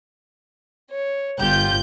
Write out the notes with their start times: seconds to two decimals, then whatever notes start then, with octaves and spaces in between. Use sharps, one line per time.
0.91 C#5
1.40 G1 F4 G4 G6